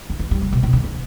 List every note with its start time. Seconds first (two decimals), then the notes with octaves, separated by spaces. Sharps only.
0.10 D3
0.19 E3
0.31 G3
0.42 C#3
0.53 B2
0.63 B2
0.73 D3
0.84 E3